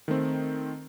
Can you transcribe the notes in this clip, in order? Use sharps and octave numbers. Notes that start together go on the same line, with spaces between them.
D#3 A3 C4